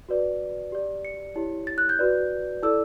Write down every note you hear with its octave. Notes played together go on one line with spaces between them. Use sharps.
F#4 B4 D5
G4 D5
C#7
E4 G4 C#5
A6
F#6
G6
F#4 B4 D5
E4 A4 D5 E6